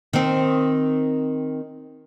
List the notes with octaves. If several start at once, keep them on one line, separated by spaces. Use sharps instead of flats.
D#3 C4